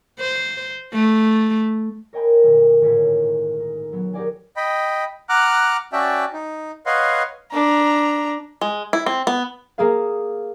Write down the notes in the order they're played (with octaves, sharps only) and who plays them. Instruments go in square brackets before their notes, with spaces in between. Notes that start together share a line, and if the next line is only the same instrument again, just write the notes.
[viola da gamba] C5
A3
[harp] A#4 C#5 D#5 G5 G#5 B5
D2 A#2
D#1 G#1 A2 C#5 B6
D#4
F#3 B3
G4 G#4 A#4 D5 F#5 G#5
[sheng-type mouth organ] D#5 G5 B5
F#5 A#5 D6 F6 F#6
C#4 F#4 D5 E5 G5 A5
D#4
B4 C#5 D#5 F5 F#5 C6
[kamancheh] D4 A#5
[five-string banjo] G#3
E4
C4
B3
[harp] A#3 G#4 F5